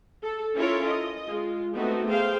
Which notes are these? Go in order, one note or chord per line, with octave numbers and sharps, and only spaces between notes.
A4
C#4 E4 F4 A4 A#4 C#5
D#5
G#3 F4
A3 B3 C4 D#4 F#4
G#4 C5 F5 G5